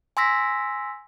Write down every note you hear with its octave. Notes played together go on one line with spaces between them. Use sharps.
G#5 C6 E6 A#6 B6